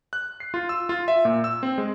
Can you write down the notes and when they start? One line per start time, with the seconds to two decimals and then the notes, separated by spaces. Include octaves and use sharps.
0.13 F#6
0.40 C7
0.54 F4
0.69 E6
0.89 F4
1.08 E5
1.25 A#2
1.44 E6
1.63 C4
1.78 G#3